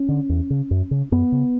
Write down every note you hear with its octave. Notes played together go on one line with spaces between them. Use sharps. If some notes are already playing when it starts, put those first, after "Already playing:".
Already playing: C#4
D3
E2
C#3
F#2
C#3
F#2 B3
C#3